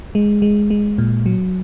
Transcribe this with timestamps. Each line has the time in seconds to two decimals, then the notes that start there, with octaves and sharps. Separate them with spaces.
0.15 G#3
0.42 G#3
0.70 G#3
0.98 A#2
1.26 F#3